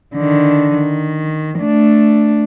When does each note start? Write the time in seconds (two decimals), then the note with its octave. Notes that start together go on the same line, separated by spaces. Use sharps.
0.14 D3 D#3
0.73 D#3
1.59 A3 D4